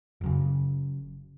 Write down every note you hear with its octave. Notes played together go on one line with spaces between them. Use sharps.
F#1 F#2 C#3